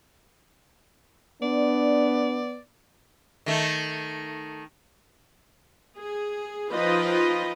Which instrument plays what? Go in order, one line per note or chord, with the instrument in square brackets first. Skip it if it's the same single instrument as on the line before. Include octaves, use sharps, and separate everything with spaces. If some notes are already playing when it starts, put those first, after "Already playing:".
[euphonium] B3 [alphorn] D4 [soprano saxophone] D5
[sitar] D#3 A3
[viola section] G#4
F3 D#4 F4 B4 D#5 G5